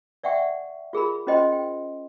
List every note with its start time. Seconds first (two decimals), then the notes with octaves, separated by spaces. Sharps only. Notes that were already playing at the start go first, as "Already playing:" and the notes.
0.23 D5 E5 F#5 G5 C#6
0.93 F4 G#4 A#4 B5
1.27 C#4 F4 C5 D#5 G5 C6
1.52 G5